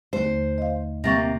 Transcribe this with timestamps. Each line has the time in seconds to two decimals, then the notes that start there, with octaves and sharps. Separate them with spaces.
0.13 D#2 D3 A3 C5
0.58 D#5 F5
1.04 C3 A#3 C#6 A6 A#6